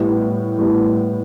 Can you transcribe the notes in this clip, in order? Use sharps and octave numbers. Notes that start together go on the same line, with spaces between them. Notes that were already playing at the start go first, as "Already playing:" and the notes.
Already playing: A2 G3 B3 E4
A2 G3 B3 E4